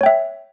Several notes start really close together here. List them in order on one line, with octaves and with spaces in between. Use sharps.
C#5 G5 E5